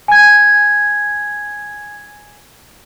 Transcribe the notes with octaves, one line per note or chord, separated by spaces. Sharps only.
G#5 G#6